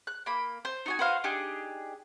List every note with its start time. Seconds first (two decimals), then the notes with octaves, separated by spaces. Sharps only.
0.07 F#6
0.26 A#3 B5
0.65 C5
0.86 D#4 F#4 G#5
0.99 F#4 B4 C5 F5
1.24 D4 D#4 G4 G#4